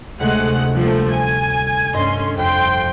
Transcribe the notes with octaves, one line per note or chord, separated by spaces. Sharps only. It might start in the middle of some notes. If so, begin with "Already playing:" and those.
D2 C3 G#3 A3 F#5
F3 G3 A3 A#3
G#5
G2 D3 C#4 D#5 C6 A6
F2 G5 C6